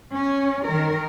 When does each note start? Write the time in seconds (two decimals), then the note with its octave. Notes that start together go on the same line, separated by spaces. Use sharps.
0.15 C#4
0.67 D#3 A#4